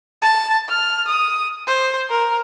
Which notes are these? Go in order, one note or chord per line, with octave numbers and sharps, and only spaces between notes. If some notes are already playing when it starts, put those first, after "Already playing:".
A5
F6
D#6
C5
A#4